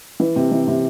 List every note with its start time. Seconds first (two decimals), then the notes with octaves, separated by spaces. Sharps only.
0.20 E3
0.36 C3
0.51 E3
0.68 C3